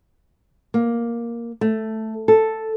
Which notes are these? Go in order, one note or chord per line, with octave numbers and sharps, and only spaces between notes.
A#3
A3
A4